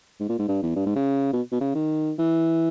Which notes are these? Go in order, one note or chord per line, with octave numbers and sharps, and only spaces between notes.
G#2
A#2
G#2
G2
E2
G2
G#2
C#3
B2
B2
C#3
D#3
E3